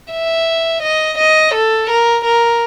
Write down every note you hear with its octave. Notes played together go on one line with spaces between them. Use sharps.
E5
D#5
D#5
A4
A#4
A#4